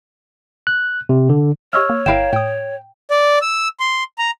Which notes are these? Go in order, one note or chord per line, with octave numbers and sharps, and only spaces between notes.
F#6
C3
D3
G4 C#5 D#5 E5 C#6 E6 F6
A#3
G1 E4 A#4 E5 F5 G5 E7
A2 G5 D#6
D5
E6
C6
A#5